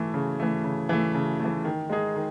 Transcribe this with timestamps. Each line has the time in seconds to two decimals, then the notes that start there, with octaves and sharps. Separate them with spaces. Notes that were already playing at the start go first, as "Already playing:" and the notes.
Already playing: E3 A3
0.14 C#3
0.40 E3 A3
0.64 C#3
0.89 E3 A3
1.15 C#3
1.40 E3 A3
1.65 D#3
1.90 G#3 D#4 G#4
2.15 D#3